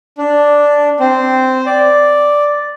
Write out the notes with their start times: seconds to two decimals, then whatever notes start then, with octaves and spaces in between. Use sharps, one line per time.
0.18 D4
1.00 C4
1.66 D5